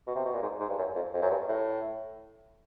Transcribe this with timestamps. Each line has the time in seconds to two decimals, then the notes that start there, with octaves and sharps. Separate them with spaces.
0.07 B2
0.16 C3
0.25 B2
0.34 A#2
0.42 G#2
0.60 G#2
0.69 G2
0.78 F#2
0.96 F2
1.14 F2
1.22 F#2
1.31 G2
1.48 A2